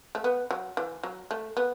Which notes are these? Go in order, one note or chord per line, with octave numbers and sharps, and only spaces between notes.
A3
B3
F#3
E3
F#3
A3
B3